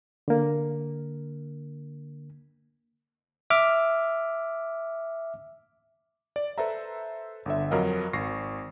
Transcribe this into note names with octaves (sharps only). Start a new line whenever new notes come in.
D3 A#3
E5 D6 F6
D5
A4 B4 C5 E5 A#5
G1 D3 E5
F2 F#3 A#4 D#5 F5
G#1 C#6 A#6 C7